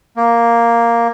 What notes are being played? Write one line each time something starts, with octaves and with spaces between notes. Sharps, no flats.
A#3